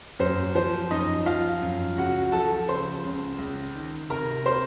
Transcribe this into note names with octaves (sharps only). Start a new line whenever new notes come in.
F#2 C5
F3 C5
F#2 D#4 D#5
F3 F4 F5
F#2
C#2 F#4 F#5
F3 A4 A5
C#3 C5 C6
C#2
C#2
D#3
C3 A#4 A#5
C5 C6